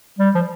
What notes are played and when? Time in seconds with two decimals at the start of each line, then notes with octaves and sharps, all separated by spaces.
0.19 G3
0.35 F3